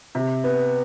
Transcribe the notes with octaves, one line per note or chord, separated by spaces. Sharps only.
C3
B3